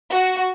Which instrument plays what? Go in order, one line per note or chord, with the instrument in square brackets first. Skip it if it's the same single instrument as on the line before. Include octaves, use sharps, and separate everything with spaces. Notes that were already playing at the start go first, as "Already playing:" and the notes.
[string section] F#4